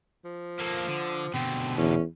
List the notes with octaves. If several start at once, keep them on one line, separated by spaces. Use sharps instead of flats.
F3
A#3 A4
D3
B2 D3 C4
E2 C#4